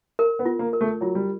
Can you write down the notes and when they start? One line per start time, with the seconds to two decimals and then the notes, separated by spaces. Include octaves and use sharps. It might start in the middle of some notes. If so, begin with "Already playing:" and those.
0.19 A#4
0.39 B3
0.45 F4
0.59 A#3
0.73 A#4
0.81 A3
1.01 F#3 F4
1.15 G3